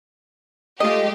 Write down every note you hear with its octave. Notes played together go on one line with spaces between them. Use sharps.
G#3 A3 F4 G4 D#5